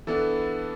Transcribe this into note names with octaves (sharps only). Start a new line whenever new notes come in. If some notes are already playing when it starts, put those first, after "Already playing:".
E3 B3 D4 A4